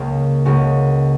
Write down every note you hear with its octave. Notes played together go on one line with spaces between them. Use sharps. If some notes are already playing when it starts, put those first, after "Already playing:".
Already playing: C#2 C#3 A#3 C#4
C#2 C#3 A#3 C#4 F#4